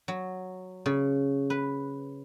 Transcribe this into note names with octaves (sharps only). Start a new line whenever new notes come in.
F#3
C#3
B4